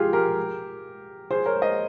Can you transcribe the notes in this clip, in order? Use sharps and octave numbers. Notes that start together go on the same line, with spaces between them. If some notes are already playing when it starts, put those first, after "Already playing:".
Already playing: F4 G4 G#4
G4 A#4
G#4 C5
A#4 C#5
C5 D#5